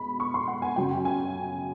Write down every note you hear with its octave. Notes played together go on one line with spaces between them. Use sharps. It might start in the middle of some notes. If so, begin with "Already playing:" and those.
Already playing: B2 G#3 B5
C#6
C6
F#5
G#5
F#2 C#3 F#3 G5
G#5